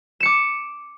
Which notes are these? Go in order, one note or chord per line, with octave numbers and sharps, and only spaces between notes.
D6 C#7 E7